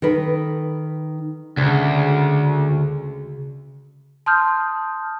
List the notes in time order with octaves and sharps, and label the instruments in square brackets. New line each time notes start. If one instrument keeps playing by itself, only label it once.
[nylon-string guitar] D#3 A4 B4
[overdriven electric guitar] D2 [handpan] C#3
[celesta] A5 C6 D#6 F6 G6